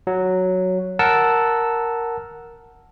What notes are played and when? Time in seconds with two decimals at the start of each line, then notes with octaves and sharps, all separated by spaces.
0.07 F#3
0.99 A#4 F#5 A5 E6